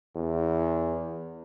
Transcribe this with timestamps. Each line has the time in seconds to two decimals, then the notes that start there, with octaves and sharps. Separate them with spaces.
0.16 E2